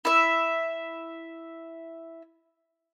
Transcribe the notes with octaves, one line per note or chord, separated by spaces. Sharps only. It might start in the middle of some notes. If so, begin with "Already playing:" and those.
E4 E5